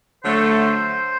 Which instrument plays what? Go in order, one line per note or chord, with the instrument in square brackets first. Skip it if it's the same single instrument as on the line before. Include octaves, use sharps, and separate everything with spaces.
[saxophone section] D3 F#3 A3 [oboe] C5